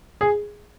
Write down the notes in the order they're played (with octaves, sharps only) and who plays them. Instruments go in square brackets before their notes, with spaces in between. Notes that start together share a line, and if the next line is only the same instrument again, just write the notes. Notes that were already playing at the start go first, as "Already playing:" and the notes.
[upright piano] G#4